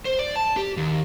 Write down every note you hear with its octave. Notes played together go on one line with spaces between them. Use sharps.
C5
D5
A5
G4
D#2